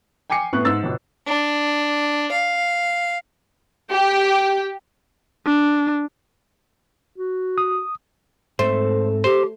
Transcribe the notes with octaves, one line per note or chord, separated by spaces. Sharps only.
G5 G#5 D6 C7 C#7
A2 B3 C#6 F#6
G#2 E6 A6
G1 B2
D4
F5
G4
D4
F#4
D#6
G#2 A3 C4 C5
G4 C5